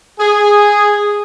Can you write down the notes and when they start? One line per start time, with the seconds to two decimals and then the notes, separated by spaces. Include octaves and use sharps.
0.19 G#4